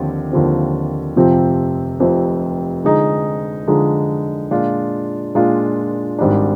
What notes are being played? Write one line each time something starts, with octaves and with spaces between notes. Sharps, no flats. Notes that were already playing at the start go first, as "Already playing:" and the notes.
Already playing: D#2 D3 F3 C4
D#2 D3 F3 C4
F1 F2 C3 F3 C4
F1 F2 C3 F3 C4
D3 F3 G#3 D#4 G#4
D3 F3 G#3 D#4 G#4
A#2 G#3 D4 F4
A#2 G#3 D4 F4
G#1 G#2 G3 D4